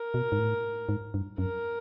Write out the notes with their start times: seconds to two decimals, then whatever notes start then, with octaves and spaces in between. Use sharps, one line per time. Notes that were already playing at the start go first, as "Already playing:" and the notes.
Already playing: A#4
0.14 B2
0.32 G#2
0.39 A2
0.89 G#2
1.14 G2
1.38 F#2 A#4